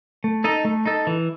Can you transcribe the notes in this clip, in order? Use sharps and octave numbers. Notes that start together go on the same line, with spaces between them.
A3
D#4 A4 D#5
A3
D#4 A4 D#5
E3